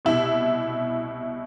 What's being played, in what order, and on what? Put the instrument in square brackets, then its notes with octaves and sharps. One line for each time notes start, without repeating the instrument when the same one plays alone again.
[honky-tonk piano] C2 B2 E4